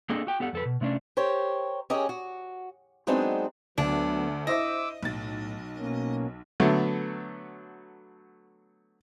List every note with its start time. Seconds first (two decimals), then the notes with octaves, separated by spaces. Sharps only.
0.10 A#3 C4 D4 G#4 A4 D#5
0.27 F#4 G5
0.40 B3 G4 A4 F#5
0.53 F2 A4 B4
0.65 B2
0.81 C3 A3 C#4 D4
1.17 G4 A#4 C5 C#5
1.90 C#4 G4 G#4 A#4 C#5 D#5
2.09 F#4
3.07 F#3 G#3 B3 C4 D4 D#4
3.78 D2 F#3 B3 D4
4.47 E4 C5 D#5 E5 D6 E6
5.03 B1 A2 A6
5.78 B2 A#3 C#4
6.60 D3 F#3 A3 B3